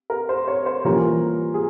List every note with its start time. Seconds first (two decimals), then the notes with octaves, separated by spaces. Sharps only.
0.10 A#4
0.29 C5
0.48 C#5
0.66 C5
0.85 E3 G3 A#3 C#4 F4 A#4
1.54 G#4